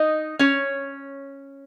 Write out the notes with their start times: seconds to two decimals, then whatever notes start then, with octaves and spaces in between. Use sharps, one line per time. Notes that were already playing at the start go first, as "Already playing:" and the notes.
Already playing: D#4 D#5
0.39 C#4 C#5